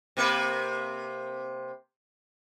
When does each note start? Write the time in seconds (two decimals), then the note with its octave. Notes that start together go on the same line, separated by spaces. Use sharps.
0.17 C3 A#3 B4